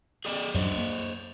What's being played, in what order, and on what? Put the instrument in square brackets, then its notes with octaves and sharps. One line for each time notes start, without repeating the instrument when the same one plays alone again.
[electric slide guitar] G#4 D5 D#5
[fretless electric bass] F#2 F#3 D4 [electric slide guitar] C5 C#5 D#5
[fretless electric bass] A#3